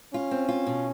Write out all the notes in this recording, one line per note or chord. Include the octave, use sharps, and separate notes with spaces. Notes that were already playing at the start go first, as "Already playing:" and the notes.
C#4 F4
C4
F4
B2